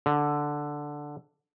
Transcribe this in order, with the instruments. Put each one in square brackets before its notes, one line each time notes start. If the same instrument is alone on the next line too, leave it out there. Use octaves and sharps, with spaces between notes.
[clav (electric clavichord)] D3